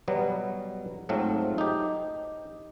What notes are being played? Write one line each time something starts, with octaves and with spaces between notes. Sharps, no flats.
B2 F#3 G3 B3
G#2 F#3 A3 C4 F4
D#4 G4